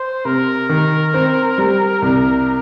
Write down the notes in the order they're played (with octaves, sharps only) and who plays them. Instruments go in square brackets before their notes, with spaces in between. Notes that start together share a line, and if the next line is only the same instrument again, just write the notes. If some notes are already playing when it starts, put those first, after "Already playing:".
Already playing: [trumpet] C5
[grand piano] C3 [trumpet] A#4
[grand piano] D#3
C4
G3
C2